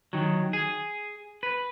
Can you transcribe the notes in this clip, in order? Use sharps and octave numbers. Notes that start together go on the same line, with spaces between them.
D#3 F#3
G#4
B4